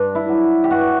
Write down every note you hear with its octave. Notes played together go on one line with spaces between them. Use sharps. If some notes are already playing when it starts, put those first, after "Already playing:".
Already playing: G2 D4
E4
F#3
G4
G2 F#4